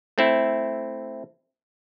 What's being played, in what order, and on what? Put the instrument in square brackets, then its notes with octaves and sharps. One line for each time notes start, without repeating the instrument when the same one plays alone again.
[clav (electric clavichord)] A3 C4 E4